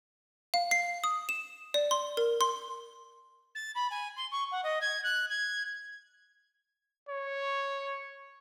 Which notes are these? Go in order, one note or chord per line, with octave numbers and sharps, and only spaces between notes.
F5
C7
D#6
E7
D5
C6
A#4
C6
A6
B5
G#5
C6
C#6
F#5
D#5
G#6
F#6
G#6
C#5